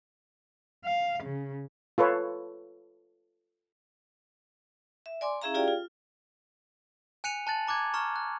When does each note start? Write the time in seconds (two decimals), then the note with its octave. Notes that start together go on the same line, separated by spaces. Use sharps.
0.85 F5
1.23 C#3
1.98 F4 A4 B4 C#5
5.06 E5
5.21 D5 G#5 C6 D6
5.42 C#4 E4 G#4 E5 F5 A#5
5.54 F4 G4 G#4 D5 F5 G5
5.68 F4
7.24 G#5 F#6 C#7 D#7 F7
7.47 A5 F#6 A6 F#7
7.67 A#5 D6 F#6 G#6
7.94 A#5 C#6 F6
8.16 F#6